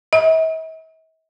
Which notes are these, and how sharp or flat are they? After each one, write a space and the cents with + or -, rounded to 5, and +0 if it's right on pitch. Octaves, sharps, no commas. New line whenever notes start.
E5 -45